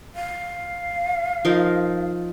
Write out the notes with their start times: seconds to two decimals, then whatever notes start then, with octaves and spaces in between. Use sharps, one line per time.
0.15 F5
1.45 F3 D#4 A#4